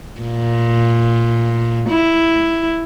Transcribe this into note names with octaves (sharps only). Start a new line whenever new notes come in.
A#2
E4